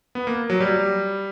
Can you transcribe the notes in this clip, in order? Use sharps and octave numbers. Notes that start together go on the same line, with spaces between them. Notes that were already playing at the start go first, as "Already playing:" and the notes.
B3
A#3
F#3
G3